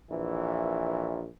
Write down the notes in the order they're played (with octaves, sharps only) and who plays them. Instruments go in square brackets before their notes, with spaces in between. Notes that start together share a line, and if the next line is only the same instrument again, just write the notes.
[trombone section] A#1 E3